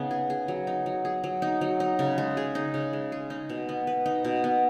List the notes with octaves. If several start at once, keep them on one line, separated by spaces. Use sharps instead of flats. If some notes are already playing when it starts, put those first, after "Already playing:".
Already playing: C#3 B3 D#4
G#4
G#4
F#3
D#4
F#3
G#4
F#3
D#4
F#3
D#4
C#3
G#3
G#4
D#4
C#3
G#3
G#4
D#4
B2
B3
B4
D#4
B2
B3